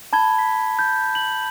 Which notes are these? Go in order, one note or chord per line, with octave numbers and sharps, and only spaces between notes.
A5 B5 G#6 G7
B6
G6
F#7